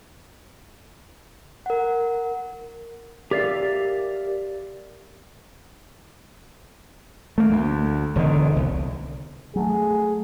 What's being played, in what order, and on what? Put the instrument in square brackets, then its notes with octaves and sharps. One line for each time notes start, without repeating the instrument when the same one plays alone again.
[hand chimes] A#4 F#5
[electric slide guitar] G4 A#4 D5 E5 F5
[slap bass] A3 A#3
D2
E1 D3 D#3
C2
[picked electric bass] F#3 A3 [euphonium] G#4